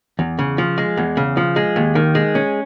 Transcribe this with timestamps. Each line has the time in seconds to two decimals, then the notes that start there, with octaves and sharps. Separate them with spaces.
0.19 E2
0.39 C#3
0.58 F3
0.78 G#3
0.97 E2
1.17 C#3
1.37 F3
1.56 G#3
1.76 D#2
1.95 D#3
2.15 G#3
2.35 C#4